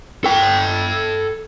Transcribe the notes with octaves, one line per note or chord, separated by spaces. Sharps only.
A4 G5